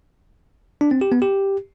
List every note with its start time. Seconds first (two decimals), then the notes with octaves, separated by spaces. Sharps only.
0.81 D4
0.91 C4
1.01 G4
1.12 B3
1.22 G4